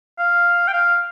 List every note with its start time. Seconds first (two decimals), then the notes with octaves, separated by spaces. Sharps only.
0.19 F5
0.68 G5
0.73 F5